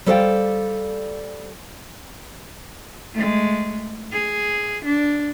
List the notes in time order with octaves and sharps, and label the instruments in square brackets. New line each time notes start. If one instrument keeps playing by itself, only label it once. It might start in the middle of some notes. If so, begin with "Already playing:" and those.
[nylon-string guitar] G3 A4 C5 E5 F5 G5
[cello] G#3 A3
G#4
D4